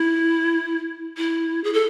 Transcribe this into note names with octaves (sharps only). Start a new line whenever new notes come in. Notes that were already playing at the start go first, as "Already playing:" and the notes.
Already playing: E4
E4
G#4
A4